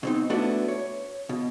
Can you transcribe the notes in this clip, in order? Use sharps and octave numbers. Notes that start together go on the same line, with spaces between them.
B2 C4 D#4
A3 B3 D4 E4 F#4 A4
C#5
B2